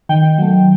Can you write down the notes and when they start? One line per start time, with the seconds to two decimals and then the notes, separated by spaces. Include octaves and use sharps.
0.09 D#3 G5
0.38 F#3 A3